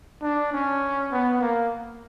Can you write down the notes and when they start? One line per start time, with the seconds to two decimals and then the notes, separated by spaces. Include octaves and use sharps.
0.22 D4
0.52 C#4
1.11 B3
1.41 A#3